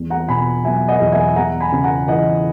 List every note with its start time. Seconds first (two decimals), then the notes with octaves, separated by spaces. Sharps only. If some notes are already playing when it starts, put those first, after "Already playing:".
Already playing: E2
0.10 F#5 A#5
0.28 B2 G#5 B5
0.64 F#3 E5 G#5
0.88 D#5 F#5
1.00 E2
1.12 E5 G#5
1.36 E2 F#5 A#5
1.60 G#5 B5
1.72 C#3
1.84 F#5 A#5
2.08 E3 D#5 F#5